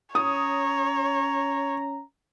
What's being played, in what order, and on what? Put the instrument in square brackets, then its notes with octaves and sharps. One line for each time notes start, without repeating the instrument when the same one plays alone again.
[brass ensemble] C#4 A#5 [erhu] C#5 [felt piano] D#6